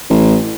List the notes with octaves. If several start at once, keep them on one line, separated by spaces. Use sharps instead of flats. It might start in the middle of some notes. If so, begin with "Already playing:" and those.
A1